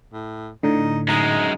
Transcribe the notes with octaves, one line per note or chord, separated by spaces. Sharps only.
A2
A2 D3 D#4
F#2 G#3 D#4